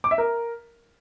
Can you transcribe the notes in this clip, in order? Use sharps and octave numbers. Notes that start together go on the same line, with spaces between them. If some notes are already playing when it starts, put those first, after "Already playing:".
D6
E5
A#4